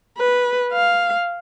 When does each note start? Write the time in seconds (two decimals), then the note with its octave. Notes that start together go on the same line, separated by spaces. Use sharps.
0.18 B4
0.72 F5